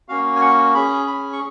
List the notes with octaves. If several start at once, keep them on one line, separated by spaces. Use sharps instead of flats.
A#3 C#4 F#4 F5
G#5
F#5
C#4 G#4 B5
B5
C#6